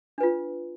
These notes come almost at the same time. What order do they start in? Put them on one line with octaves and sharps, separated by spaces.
D4 B4 F4